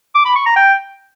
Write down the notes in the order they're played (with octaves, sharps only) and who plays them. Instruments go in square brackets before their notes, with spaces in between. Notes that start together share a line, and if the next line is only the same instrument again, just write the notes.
[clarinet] D6
B5
C#6
A#5
G5